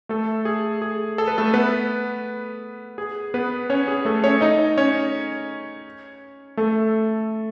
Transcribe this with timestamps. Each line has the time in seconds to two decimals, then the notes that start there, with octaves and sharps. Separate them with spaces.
0.09 A3 A4
0.45 G#4
0.82 G#4
1.18 A4
1.28 B4
1.38 A3 A4
1.54 B3 B4
2.98 G#4
3.34 B3 B4
3.70 C#4 C#5
3.88 G#4
4.05 A3 A4
4.24 C#4 C#5
4.41 D#4 D#5
4.77 C#4 C#5
6.57 A3 A4